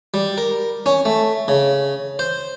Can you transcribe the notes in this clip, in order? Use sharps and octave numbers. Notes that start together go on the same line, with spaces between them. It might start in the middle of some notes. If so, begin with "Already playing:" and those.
G3
A#4
C#4
A3
C#3
C5